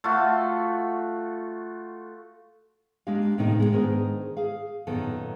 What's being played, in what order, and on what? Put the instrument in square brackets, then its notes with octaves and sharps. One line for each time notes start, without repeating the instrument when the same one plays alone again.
[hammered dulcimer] A3 F4 F#4
[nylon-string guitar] G#3 A#3 D4 G4 F5
A2 C3 D#3 A3 B3 D#4
G#3 A#3 B3 F4
G#2 D#3 B3 D4 G#4 A#4
G#4 F5
F#2 A#2 D#3 B3 A4